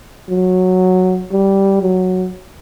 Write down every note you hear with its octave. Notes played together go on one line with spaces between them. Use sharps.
F#3
G3
F#3